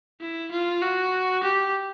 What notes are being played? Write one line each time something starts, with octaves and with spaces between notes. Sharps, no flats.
E4
F4
F#4
G4